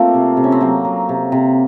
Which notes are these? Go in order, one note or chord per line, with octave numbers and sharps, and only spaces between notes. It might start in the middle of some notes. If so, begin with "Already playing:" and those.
Already playing: A3 A#3 C4 F4
C3
C3
C#4
C4
F#3 A#3
F#3
C3
C3